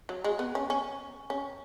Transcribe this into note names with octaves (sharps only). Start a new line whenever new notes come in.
F#3
G#3
B3
C#4
C#4
C#4